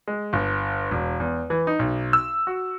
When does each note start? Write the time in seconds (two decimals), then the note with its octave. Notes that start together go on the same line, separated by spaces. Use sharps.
0.07 G#3
0.33 G1
0.91 E1
1.20 E2
1.50 E3
1.67 D#4
1.79 B1
2.13 E6
2.47 F#4